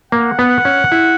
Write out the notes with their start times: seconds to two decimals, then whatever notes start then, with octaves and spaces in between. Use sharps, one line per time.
0.12 A#3 F#5
0.39 B3
0.65 C#4
0.92 E4